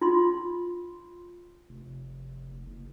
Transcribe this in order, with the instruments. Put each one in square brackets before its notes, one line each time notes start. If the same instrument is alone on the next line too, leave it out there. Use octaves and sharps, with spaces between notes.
[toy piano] F4 C6
[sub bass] F1
F#1